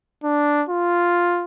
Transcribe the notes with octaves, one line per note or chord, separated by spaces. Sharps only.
D4
F4